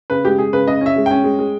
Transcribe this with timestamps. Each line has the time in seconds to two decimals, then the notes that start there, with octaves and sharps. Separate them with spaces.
0.10 C#3 B4
0.25 G#3 G4
0.38 G#3 G#4
0.53 C#3 B4
0.67 C#3 D#5
0.81 C#4 E5
0.96 G#3
1.06 C#4 G5
1.24 G#3
1.39 G#3